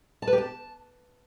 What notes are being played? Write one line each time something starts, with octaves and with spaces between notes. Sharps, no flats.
A5
B4
G4
A5